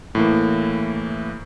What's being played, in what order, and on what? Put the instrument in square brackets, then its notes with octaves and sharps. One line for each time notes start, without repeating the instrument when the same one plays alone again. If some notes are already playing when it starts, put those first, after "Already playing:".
[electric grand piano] A2 E3 A#3